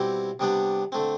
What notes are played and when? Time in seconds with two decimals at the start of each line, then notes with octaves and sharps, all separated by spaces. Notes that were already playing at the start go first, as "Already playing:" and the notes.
Already playing: B2 G3 C4 E4 G4
0.40 C3 G3 B3 D4 G4
0.92 D3 A3 C4